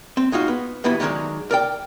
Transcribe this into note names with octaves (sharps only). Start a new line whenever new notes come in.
C4
G#3 D#4 F4 F#4
B3
G2 B2 E3 B3 E4 B5
D3 D#3 F#3 G#3 D4
A#4 D5 G5